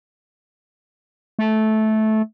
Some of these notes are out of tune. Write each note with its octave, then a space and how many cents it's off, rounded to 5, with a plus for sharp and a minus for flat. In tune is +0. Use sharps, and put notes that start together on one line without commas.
A3 -15